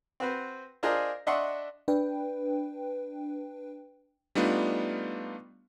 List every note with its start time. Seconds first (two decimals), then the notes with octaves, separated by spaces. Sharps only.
0.20 C4 F#4 B4 C5
0.83 D4 F4 G#4 A#4 C5 D#5
1.27 D4 D#5 E5 F#5 C6 C#6
1.88 D4 B4 G5
4.35 G3 A3 B3 D4 D#4 F4